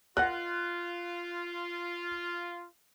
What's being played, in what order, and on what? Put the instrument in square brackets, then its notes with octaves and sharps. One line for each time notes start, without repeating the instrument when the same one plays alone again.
[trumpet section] F4 [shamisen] A#4 D#5 F#5 [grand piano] F#6